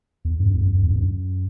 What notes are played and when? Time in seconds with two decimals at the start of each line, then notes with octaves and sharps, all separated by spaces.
0.25 E2
0.40 G2
0.46 F#2
0.54 E2
0.61 F#2
0.75 F#2
0.83 E2
0.90 G2
0.96 F#2